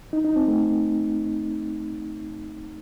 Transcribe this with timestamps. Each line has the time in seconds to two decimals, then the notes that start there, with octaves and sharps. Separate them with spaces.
0.13 D#4
0.25 D#4
0.36 C4
0.48 A3